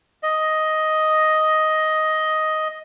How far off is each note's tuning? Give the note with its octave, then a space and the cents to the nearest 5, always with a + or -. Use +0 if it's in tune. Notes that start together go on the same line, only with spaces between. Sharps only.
D#5 +5